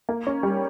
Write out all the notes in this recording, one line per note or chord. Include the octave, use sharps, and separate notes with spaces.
A#3
C#4
G3